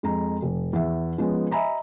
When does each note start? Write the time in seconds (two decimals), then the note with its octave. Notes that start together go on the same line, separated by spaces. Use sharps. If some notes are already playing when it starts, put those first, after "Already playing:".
0.03 F2 G#3 A#5
0.42 F1
0.73 E2 E5
1.18 F3 G#3 B3 C#4
1.51 D#5 E5 G#5 A#5 B5